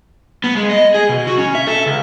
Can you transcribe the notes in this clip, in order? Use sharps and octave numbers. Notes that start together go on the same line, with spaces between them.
B3
G#3
D#5
G#4
B2
F#4
C#4
E5
A4
C#2